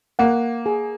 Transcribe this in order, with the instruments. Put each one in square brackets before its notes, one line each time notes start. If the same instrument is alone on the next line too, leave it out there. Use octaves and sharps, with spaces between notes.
[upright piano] A#3 [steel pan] F#5
[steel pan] G#4